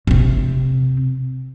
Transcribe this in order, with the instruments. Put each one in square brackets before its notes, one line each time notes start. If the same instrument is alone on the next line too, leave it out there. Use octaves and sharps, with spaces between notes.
[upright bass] C3 C4